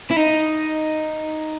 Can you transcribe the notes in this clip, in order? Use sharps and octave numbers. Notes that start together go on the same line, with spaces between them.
E4
D#4